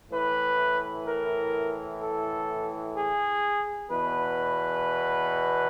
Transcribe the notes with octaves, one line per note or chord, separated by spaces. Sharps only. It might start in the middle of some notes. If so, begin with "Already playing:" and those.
A2 E3 B4
A#4
A4
G#4
E2 B2 B4